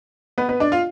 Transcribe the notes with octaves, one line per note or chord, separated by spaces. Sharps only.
B3 B4
B3 B4
D4 D5
F4 F5